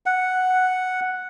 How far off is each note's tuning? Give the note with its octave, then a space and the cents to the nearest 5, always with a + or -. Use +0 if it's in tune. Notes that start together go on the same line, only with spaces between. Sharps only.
F#5 +0